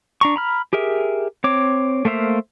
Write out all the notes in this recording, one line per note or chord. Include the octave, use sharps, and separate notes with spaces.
D4 A#5 C#6
A#5 B5 F6
G4 G#4 A#4 E5
C4 C#5 D6
A3 A#3 C5 E5 F5